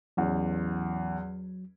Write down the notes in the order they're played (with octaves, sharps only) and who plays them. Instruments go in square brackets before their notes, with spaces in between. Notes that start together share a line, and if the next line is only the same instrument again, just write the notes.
[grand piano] A1 E2 [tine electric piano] F#3